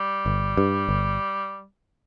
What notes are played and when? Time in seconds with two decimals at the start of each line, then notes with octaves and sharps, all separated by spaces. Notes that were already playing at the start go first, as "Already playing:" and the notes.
Already playing: G3
0.26 G1
0.57 G2
0.89 G1